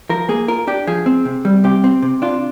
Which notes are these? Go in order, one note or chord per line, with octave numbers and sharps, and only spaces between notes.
F3 A#4
A#3 G#4
F4 A#4
D4 G4
F3 G#4
C4
C3
G3
C3 G4
C4
C3
D4 F4